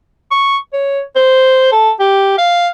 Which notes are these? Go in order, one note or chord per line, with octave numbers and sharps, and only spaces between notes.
C#6
C#5
C5
A4
G4
F5